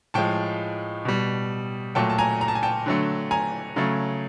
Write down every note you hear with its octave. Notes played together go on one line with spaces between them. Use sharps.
A2 F3 G#3 G5 A5
B2 G3
A#2 F#3 A3 G5 A5
A5
G#5 A#5
A#5
A5
G#5
G5 A5
D3 F#3 A3
G#5 A#5
C#3 F#3 A3